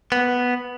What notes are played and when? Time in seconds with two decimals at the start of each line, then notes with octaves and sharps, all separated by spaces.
0.12 B3